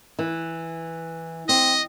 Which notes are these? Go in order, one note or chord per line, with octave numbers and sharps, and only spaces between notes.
E3
C4 D#5